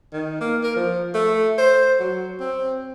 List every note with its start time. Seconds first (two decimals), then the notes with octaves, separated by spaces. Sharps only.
0.13 D#3
0.41 A#3
0.64 A#4
0.76 F3
1.14 A3
1.58 C5
2.00 F#3
2.39 C4